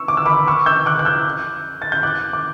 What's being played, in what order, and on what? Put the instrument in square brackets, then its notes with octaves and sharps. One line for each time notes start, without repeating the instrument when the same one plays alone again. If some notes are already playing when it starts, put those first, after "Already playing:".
Already playing: [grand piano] C#6 E6
D6
E6
B5 D6
C#6 E6
E6 G6
D6 F#6
F#6
E6 G6
A6
G6
D6 F#6
D6